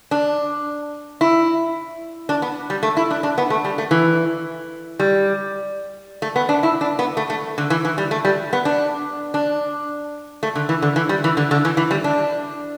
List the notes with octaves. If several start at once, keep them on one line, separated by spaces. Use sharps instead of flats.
D4
E4
D4
B3
G3
A3
E4
D4
D4
B3
A3
G3
A3
E3
G3
A3
B3
D4
E4
D4
B3
A3
A3
D3
E3
E3
G3
A3
G3
B3
D4
D4
A3
D3
E3
D3
E3
G3
E3
D3
D3
E3
E3
G3
D4